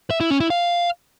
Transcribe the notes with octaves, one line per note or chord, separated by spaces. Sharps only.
E5
E4
C#4
E4
F5